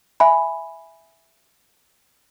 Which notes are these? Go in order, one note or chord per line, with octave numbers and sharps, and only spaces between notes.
E5 G#5 B5